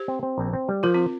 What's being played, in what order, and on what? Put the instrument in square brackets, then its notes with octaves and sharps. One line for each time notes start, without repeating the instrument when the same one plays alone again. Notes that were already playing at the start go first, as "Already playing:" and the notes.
Already playing: [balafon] G4 C5
[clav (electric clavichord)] C4
C4
A#1
C4
G3
[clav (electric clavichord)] F3 [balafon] F4 A#4
[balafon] C4 F4